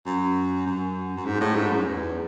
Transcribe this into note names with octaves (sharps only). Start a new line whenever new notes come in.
F#2
F#2
F#2
G#2
A2
G#2
F#2
E2